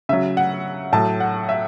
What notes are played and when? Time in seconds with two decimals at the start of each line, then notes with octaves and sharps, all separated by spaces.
0.09 C#3 F#3 E5
0.37 F#5
0.92 A2 F#3 A5
1.20 F#5
1.49 E5